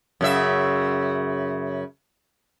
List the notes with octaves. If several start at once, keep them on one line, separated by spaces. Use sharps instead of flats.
F#2 C#3 E5